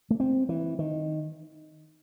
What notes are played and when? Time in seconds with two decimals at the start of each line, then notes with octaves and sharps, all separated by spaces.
0.10 A3
0.20 C4
0.49 E3
0.79 D#3